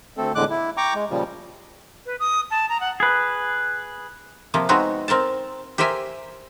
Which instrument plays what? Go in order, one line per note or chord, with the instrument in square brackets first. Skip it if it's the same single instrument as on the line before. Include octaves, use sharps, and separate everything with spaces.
[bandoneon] D2 A3 C4 A4
E2 A2 D3 G#3 D6 F#6
E4
G5 A#5 C#6 D6
G#3
A#2 C#3 F3 G3
[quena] B4
D#6
A5
A#5
F#5
[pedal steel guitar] G#4 B4
[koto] C3 F3 A#3
G#3 B3 C4 D#4 F#4
C4 A#4 G5 A5
G4 A#4 C5 E5 G5 G#5